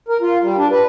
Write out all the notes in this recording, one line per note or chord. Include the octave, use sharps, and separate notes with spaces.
A#4
F4
G3
D4
B4